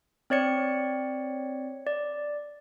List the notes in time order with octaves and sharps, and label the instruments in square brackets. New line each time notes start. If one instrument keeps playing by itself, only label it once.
[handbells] C4 C#5 D5 C#7
D5